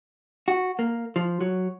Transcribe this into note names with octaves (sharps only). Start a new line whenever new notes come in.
F#4
A#3
F3
F#3